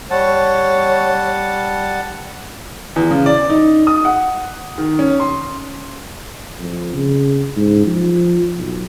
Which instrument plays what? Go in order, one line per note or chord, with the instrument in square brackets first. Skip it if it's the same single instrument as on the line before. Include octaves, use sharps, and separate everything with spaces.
[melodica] G3 F#5 A5 [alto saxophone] C#5
[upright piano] E2
C#3
D5
D#4
D#6
F#5
D#3
C#4
C6
[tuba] F2
C#3
G#2
F3
B1